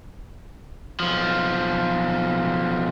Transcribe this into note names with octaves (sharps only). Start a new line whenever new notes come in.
B1 F3